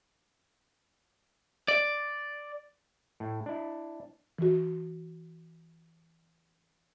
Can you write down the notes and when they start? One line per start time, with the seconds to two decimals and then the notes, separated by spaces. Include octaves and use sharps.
1.68 D5
3.20 A2
3.46 D4 E4
4.38 E3 F#4